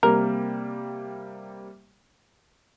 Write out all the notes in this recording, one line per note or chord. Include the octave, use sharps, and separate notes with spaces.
C3 G3 A#3 A#4